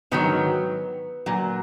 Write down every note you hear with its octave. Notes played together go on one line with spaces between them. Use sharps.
G#2 D#3 F#3 B3
A#2 F#3